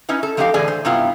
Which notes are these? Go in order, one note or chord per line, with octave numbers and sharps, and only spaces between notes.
C#4 D#4 E4 B4
A4
F3 A3 D4 D#4 G4 F5
A2 D3 E3 G#4 D5 G#5
C5
G2 C3 G3 B3 E4 F4